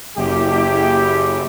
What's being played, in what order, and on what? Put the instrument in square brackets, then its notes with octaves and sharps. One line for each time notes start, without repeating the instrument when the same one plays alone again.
[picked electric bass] F#1 [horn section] E4 G4